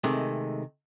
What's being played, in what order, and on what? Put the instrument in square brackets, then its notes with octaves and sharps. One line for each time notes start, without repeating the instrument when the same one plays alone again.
[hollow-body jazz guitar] C3 D#3 G#3 A3